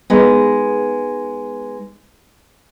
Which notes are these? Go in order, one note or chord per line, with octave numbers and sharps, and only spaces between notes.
G#3 B3 D#4